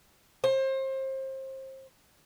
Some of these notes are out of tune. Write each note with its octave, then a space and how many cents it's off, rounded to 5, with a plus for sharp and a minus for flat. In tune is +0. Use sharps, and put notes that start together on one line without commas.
C5 +30